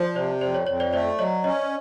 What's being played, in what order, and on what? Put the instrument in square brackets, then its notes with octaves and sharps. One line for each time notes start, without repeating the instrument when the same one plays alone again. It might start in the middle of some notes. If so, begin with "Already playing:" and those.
Already playing: [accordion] F3 [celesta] C5 D5
[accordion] C3 [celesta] C5 D5
[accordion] F2 [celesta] C5 D5
[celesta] C#5
[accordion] F2 [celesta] C#5
[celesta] C5 D5
[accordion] A3 [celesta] C5 D5
[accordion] F#3 [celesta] C#5 D#5
[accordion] C#4 [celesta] C#5 D#5